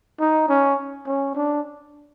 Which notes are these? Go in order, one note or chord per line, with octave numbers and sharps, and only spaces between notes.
D#4
C#4
C#4
D4